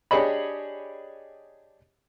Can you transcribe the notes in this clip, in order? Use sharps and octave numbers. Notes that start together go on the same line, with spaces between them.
D4 G4 G#4 C#5 D#5 B5